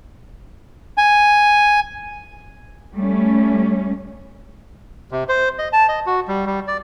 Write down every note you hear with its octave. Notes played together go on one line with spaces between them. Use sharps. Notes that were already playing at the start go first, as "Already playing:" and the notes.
G#5
G3 A3 C#4
C3
C5
D#5
A5
D#5
F#4
G3
G3
D5